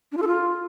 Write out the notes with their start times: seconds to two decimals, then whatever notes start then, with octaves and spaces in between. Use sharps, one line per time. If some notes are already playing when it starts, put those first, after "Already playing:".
0.12 D4
0.17 F4
0.22 A4
0.27 F4